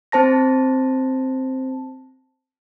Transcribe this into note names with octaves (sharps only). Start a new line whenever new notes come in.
C4 C5 A5 A#6